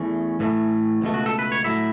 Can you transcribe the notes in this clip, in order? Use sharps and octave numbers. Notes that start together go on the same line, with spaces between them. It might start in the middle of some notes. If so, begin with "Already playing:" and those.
Already playing: E2 E3 A3 C#4
A2 E3 A3
C#2 B2 A3
F#4
A4
B4
C#5
A2 F#3 A3 E4 E5